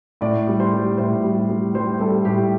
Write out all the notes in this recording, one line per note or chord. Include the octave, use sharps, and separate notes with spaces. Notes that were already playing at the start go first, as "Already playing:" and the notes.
A2 D5
G3
C5
G3
A2 C5
G3
G3
G3 C5
G3 A4
A2 G4